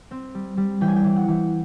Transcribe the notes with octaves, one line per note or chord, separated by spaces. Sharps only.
C4
G3
G3
E3 G5
G#5
G5
E3
F#5
E3